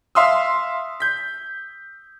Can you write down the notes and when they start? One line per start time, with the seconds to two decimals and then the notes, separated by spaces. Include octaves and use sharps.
0.15 E5 F5 C6 D#6 E6
1.00 G6 B6